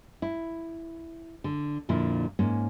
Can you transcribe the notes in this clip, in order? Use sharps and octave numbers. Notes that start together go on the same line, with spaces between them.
E4
D3
F2 A#2 D3 E4
G#2 A#3 C#4